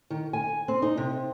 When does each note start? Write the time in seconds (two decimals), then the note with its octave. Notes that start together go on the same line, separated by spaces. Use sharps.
0.10 D#3
0.33 G#5
0.68 C4
0.82 D#4
0.97 C3